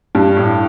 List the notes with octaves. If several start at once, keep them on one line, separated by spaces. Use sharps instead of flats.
G2
A2